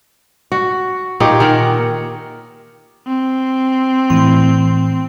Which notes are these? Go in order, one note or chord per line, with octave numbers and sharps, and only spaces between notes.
F#4
A#2 D#4 G4 C#5
D#3 A#4 F#5
C4
A2 E3 C6